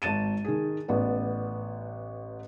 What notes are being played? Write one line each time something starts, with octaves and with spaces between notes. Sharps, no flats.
G#1 A5 A6 D#7 E7
D#3 G#4
A1 B3 D5